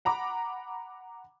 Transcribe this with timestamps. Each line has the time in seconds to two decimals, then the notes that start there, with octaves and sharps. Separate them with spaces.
0.05 F#5 A#5 B5 D6